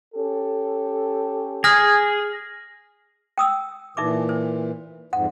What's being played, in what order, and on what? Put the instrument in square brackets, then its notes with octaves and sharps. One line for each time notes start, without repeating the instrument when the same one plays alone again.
[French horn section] C#4 G4 A4
[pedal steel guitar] G#4 [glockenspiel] F6 A#6
[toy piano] G5 D#6 E6
[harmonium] A#2 E3 [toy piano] D#4 E5 D6
[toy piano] C5
[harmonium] F2 G#2 [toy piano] F#5